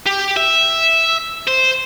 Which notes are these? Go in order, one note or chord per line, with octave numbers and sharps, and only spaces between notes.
G4
E5
C5